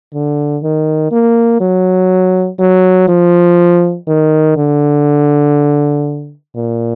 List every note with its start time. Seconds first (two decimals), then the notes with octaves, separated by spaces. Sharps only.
0.14 D3
0.63 D#3
1.12 A#3
1.61 F#3
2.59 F#3
3.09 F3
4.08 D#3
4.57 D3
6.55 A#2